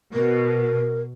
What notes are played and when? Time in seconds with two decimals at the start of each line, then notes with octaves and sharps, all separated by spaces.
0.14 B2 A#4